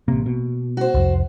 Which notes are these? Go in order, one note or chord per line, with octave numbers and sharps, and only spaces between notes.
A1 C3 A#3
B2
F#4 C5
C2 F2